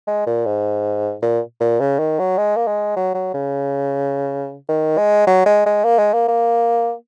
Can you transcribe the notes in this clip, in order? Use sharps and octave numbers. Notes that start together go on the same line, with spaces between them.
G#3
A#2
G#2
A#2
A#2
C#3
D#3
F#3
G#3
A#3
G#3
F#3
F#3
C#3
D#3
G#3
F#3
G#3
G#3
A#3
G#3
A#3
A#3